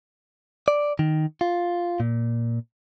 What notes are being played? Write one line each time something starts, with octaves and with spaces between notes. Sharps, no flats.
D5
D#3
F4
A#2